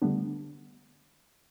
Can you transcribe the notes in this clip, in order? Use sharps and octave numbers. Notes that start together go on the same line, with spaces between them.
D3 G3 A3 B3 D4